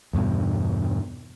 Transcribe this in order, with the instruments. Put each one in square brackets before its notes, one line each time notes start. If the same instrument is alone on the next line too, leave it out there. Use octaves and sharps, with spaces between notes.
[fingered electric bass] E2 G2 B2 D3